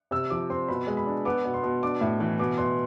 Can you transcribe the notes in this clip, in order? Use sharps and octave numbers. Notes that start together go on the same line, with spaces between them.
C3 E6
F3 D6
C4 C6
B2 B5
G#3
B5
D4
B3 D6
B2
C6
B2
D4 D6
A2
E3
B2 D6
B2 C6